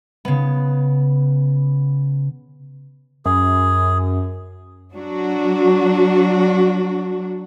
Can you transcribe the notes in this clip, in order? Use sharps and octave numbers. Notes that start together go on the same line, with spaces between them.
C#3 B3
F#2 G#4
F#3 D4 F#4